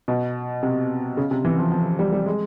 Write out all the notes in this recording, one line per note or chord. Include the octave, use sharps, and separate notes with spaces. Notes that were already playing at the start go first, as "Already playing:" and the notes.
B2
C3
C#3
C3
E3
F3
F3
G3
G3
G#3